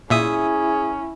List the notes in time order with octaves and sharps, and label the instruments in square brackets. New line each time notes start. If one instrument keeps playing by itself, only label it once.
[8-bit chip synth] A#2 E5 D#6 [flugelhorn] C#4 [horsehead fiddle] E4 [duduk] G#4